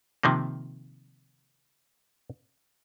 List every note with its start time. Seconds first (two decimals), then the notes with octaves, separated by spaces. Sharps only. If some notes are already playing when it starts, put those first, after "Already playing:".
0.23 C3 D#3 F3 A#3